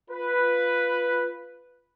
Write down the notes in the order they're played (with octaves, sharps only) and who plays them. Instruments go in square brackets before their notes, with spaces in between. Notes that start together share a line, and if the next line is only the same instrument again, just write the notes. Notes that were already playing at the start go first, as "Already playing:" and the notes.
[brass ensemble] F4 B4